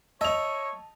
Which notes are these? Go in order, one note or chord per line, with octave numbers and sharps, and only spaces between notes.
C#5 D#5 E5 A5 F7